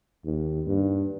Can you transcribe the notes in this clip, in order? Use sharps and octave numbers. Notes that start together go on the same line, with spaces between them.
D#2
G2